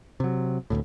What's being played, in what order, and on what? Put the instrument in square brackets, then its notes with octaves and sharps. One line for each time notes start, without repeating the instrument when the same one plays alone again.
[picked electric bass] C3 F#3
D1 G1 D2 A2